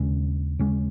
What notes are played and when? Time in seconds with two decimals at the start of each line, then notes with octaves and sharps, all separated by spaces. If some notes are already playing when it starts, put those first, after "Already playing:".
Already playing: D#2 C#3 G#3 C#4
0.59 D#2 C#3 G#3 C#4